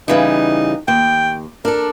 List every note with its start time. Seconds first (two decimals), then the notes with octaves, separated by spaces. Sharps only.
0.08 C#3 E3 G3 D#4
0.88 D#2 G5
1.65 D4 A4 A#4